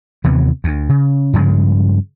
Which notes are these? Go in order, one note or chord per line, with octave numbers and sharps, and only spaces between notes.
D#2 C3 E3 B3
D2
C#3
G2 C#3 F3 G#3